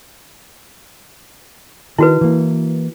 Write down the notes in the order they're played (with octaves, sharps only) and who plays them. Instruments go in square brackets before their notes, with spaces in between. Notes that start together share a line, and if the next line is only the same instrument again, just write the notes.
[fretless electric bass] D#3 [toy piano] E4 F#4 B4
[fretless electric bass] E3 A#3